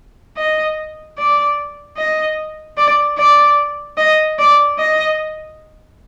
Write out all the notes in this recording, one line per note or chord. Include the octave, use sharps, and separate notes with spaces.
D#5
D5
D#5
D5
D5
D#5
D5
D#5